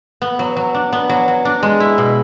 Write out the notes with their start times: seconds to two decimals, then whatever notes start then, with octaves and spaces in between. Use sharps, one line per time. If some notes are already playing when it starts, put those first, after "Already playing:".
0.22 B3
0.39 F#3
0.56 F#3
0.74 D4
0.93 B3
1.09 F#3
1.28 F#3
1.45 D4
1.63 G#3
1.80 E4
1.98 B2